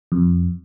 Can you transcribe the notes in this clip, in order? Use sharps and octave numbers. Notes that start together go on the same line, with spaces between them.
F2